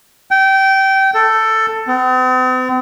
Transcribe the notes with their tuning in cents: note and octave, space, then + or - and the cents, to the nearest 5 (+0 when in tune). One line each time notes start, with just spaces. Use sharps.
G5 -20
A4 +10
C4 -45